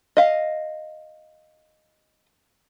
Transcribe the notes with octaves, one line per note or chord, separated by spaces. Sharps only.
D#5 F5